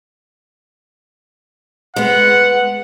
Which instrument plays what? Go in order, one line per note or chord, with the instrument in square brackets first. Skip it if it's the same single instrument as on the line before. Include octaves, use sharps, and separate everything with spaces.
[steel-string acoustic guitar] G#3 B3 [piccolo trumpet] F#5